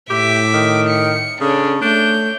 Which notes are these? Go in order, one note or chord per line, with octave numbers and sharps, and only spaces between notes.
A2 G4 E5 D6
D#3
C#7
C#3 C#4 D4 A4
A3 D4 C#5 G6